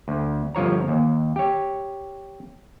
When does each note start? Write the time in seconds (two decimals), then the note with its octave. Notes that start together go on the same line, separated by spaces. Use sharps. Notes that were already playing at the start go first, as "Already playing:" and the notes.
0.08 D2
0.55 G1 F3 C#5 A#5
0.88 D#2
1.36 G4 C#5